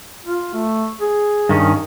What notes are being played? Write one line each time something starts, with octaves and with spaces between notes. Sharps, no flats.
F4
A3
G#4
G2 D#3 C#4